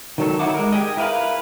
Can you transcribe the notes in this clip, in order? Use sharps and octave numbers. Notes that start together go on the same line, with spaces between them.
D#3 F#3 A4
D#3 D#4 E4 F#5 D6
G#3 A#4
G4 G#4 D#5
E4 A#4 B4 F5 B5